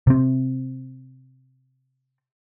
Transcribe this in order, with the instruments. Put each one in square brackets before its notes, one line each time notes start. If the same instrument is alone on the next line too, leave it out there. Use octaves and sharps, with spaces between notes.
[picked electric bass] C3 C4